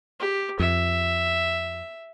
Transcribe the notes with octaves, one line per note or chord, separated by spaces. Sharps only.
G4
F2 E5